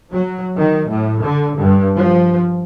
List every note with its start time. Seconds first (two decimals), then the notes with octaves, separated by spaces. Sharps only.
0.12 F#3
0.57 D#3
0.90 A2
1.23 D3
1.58 G2
1.97 F3